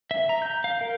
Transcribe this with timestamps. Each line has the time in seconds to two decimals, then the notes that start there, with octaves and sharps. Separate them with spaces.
0.11 E5
0.29 A#5
0.42 G6
0.64 F5
0.81 A#4